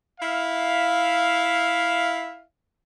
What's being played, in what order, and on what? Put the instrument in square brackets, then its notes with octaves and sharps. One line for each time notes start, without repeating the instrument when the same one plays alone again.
[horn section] E4 E5 F5